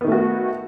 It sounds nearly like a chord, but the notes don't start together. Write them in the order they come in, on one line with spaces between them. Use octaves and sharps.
B3 D#3 A3 F#4